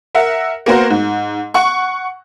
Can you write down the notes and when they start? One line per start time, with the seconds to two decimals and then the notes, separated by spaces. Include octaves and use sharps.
0.15 A#4 E5 F#5
0.66 A#3 B3 F#4 A#4 C5
0.90 G#2
1.54 F#5 C#6